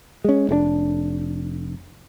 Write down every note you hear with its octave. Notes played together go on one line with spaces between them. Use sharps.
G#3 C#4
F1 G#2 D4